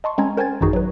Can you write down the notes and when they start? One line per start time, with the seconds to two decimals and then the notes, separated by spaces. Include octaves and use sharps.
0.04 D#5 A5 C6 C#6
0.18 G#3 C4 C#4 G#5 A#5 G#6
0.37 A#4 C5 G5 G#5 G#6 A6
0.61 A1 F#2 D#3 D#4 F#4 G#4
0.73 F#3 B4